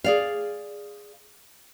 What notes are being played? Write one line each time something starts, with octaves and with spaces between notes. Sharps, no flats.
G#4 D5 F5